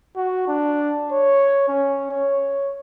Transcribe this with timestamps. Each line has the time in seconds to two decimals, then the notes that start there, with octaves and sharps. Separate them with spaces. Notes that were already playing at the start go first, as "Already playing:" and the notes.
0.16 F#4
0.48 D4
1.12 C#5
1.68 C#4
2.11 C#5